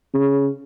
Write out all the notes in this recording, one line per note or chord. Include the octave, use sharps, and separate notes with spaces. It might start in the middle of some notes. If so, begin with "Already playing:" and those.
C#3